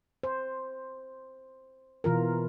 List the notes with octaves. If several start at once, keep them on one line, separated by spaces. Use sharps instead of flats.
C5
B2 E3 F4 A#4